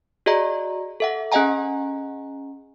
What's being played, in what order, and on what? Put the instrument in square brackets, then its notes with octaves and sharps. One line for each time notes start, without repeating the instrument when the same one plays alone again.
[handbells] F#4 G#4 D5 D#5 A#5
A4 E5 F#5
C#4 G#4 D#5 F#5 G#5 A#5